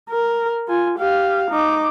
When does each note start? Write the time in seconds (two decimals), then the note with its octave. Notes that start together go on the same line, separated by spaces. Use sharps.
0.10 A#4
0.68 F4 G#5
0.99 G4 F5
1.51 D#4 D6